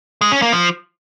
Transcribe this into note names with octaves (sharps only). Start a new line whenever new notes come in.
G#3
C#4
A#3
F3